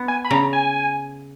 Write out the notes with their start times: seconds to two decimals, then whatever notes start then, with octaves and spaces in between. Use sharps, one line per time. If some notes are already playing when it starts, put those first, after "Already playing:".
Already playing: B3
0.08 G#5
0.25 B5
0.31 C#3 A#5
0.53 G#5